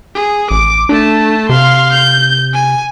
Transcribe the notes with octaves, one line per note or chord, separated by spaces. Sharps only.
G#4
A1 D6
A3 D4 A5
C3 F5 C6
G6
G#5